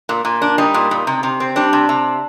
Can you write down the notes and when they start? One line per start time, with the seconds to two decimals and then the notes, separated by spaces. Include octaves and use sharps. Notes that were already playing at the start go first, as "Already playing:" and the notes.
0.09 A#2
0.25 A#2
0.42 D4
0.58 G3 D#4
0.74 A#2
0.91 A#2
1.07 C3
1.23 C3
1.40 C4
1.56 G3 D4
1.73 C3
1.89 C3